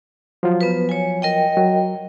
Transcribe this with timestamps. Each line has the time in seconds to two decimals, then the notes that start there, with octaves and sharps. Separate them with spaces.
0.43 F3 F#3 F4
0.61 B3 B4
0.89 C#5 G#5
1.22 A#4 D#5 G5
1.57 F#3